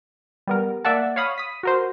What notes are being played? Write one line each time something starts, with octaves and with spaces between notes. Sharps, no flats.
G3 B3 A#4
A#3 D5 E5 F#5 A5
C#5 F5 B5 D#6
D#6 B6
F#4 A#4 C5